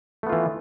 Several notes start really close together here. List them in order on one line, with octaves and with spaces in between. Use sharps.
A3 B3 F4 E3